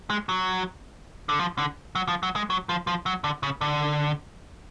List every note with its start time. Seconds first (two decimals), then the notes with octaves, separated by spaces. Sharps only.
0.10 G#3
0.29 F#3
1.29 D3
1.39 F3
1.58 D3
1.95 F#3
2.08 F3
2.23 F#3
2.36 G#3
2.50 F#3
2.69 F3
2.87 F3
3.06 F#3
3.24 D3
3.43 C#3
3.61 D3